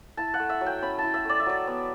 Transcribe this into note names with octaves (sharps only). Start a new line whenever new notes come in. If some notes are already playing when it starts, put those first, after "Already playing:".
E4 A5
F#5
A3
E5
F#3
G5
C#4 B5
E4 A5
E5
A3 D5
E5
F#3 D5
B3